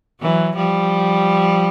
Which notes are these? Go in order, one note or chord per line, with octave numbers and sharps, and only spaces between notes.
E3 F#3
F3 G3